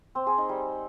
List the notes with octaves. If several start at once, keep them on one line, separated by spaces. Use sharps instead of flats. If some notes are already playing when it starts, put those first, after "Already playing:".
C4
G#4
D#4
G3